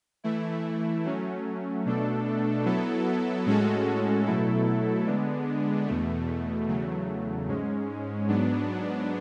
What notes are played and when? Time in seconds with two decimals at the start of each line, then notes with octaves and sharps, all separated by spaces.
0.24 E3 A3 E4
1.05 F#3 A3 C#4
1.86 B2 A3 D4 A4
2.65 F#3 B3 E4 A4
3.46 A2 G#3 C#4 F#4 A4
4.26 B2 F#3 A3 E4 A4
5.07 D3 G#3 B3 D4
5.87 E2 B2 A3
6.67 E2 C#3 F#3 A3
7.47 G#2 G#3 C#4
8.28 G#2 F#3 B3 D4